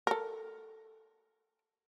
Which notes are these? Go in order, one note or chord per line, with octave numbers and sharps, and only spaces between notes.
A4 A#4